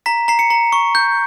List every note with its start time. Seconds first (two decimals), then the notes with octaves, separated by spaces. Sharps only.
0.06 A#5 B6
0.28 A#5 C7
0.39 C#7
0.50 A#5
0.73 C#6
0.95 G6